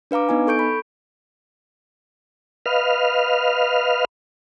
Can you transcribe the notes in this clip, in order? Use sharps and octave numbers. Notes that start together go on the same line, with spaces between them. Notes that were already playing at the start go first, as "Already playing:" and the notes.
D4 B4 F5 A#5 D6
B3 D#4 G#5
A4 C#6 G6 D7
B5
B4 D#5 F5 F6